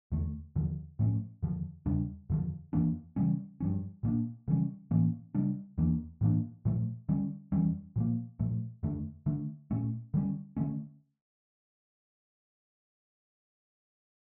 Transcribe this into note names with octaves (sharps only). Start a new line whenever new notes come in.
E2 D3 A3
E2 D3 F3
A2 F3 A3 C#4
F2 D3 F3
E2 C#3 G3 D4
F2 D3 F3
F2 E3 A#3 D4
C#3 E3 G3 C#4
G2 F3 C#4
A#2 G3 A#3 D4
C#3 E3 G3 C#4
A2 E3 A#3 C#4
C#3 G3 D4
E2 E3 A#3 D4
A2 E3 A#3 D4
A#2 F3 A3
D3 G3 C#4
F2 E3 G3 C#4
A#2 F3 A#3
A#2 F3 A3
F2 D3 A3 D4
D3 A3 D4
A#2 A3 C#4
D3 G3 A#3 C#4
D3 A3 C#4